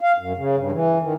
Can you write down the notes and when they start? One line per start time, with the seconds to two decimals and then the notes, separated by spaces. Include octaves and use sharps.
0.01 F5
0.18 F#2
0.37 C#3
0.57 G2
0.72 E3
1.02 D#3